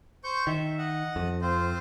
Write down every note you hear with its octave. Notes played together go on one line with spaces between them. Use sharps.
C5 C#6 G6
D#3 E5
D#5 F#5
F2
C4 F4 C5